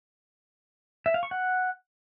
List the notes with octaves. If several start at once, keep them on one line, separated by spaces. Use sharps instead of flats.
E5
F5
C#6
F#5